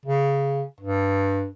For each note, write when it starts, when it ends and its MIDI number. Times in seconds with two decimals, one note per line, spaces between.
0.06 0.63 49
0.81 1.47 43